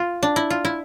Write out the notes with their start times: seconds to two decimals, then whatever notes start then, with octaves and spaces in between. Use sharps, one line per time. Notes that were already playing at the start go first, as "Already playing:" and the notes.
Already playing: F4
0.23 D4
0.36 E4
0.50 F4
0.65 E4